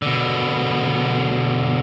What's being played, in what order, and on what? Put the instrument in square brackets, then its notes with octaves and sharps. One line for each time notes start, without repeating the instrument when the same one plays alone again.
[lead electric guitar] B2 D3